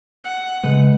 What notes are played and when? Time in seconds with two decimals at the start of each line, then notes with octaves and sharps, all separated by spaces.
0.24 F#5
0.63 C#3 G#3 A3 B4